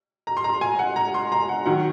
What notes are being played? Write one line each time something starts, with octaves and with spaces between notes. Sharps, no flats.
A#5
C6
A#5
G#5
F#5
A#5
C6
A#5
F#5
D#3 F#3 F#5